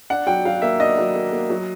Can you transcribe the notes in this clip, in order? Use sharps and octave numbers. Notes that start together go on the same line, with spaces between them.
D4 F#5
F#3 G5
F#3 F5
A#3 E5
D4 D#5
F#3
A#3
A#3
F#3